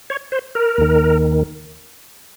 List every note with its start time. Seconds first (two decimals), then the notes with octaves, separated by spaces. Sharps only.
0.10 C#5
0.32 C5
0.55 A#4
0.78 D#2 D#3